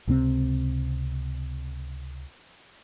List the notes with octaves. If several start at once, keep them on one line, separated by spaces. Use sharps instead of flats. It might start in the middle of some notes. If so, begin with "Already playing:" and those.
C#2 C3 G#3 C4